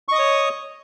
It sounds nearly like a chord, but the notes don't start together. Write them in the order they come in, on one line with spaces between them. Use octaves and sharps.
C#6 D#5 D#6 C#5